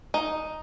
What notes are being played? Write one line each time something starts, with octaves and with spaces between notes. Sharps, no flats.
D#4